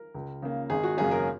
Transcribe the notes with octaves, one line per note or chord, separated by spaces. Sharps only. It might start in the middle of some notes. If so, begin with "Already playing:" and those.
Already playing: A#4
C#2
C#3 A#3
G#1 G#4
F#4
F#2 C#3 A#3 C#4 G#4
A#4